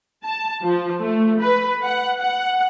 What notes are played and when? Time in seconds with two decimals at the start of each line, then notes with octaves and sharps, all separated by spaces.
0.25 A5
0.63 F3
1.01 A3
1.42 B4
1.82 F#5
2.19 F#5